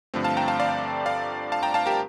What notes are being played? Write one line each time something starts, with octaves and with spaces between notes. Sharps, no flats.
G2 D3 F3 A3 C4
F5 A5
G5 A#5
F5 A5
D5 F5
D5 F5
F5 A5
G5 A#5
F5 A5
G4 A#4